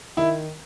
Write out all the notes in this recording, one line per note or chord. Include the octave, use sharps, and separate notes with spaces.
D#3 E4